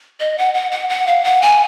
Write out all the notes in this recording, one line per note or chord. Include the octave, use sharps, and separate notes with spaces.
D#5
F#5
F#5
F#5
F#5
F5
F#5
G#5